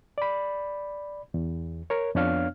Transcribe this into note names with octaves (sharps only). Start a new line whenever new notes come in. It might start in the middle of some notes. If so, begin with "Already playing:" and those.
D5 B5
E2
A#4 C#5
F2 B3 D4 C#5 F5 F6